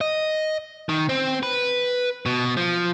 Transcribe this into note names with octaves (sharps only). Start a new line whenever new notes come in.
D#5
D#3
C4
B4
B2
F3